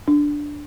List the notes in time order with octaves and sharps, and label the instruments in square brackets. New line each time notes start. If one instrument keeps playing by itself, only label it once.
[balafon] D4